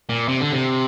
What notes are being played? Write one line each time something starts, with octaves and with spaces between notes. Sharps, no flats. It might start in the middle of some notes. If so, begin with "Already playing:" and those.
A#2
C3
D3
C3